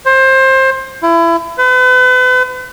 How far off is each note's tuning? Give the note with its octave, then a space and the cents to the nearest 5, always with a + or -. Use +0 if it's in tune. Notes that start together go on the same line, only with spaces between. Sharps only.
C5 +20
E4 +30
B4 +40